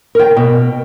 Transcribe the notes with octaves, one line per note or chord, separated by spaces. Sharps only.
A#4 G5
B2